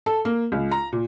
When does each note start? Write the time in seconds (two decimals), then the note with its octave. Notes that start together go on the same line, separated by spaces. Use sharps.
0.06 A4
0.25 A#3
0.52 C#2
0.71 A#5
0.93 A#2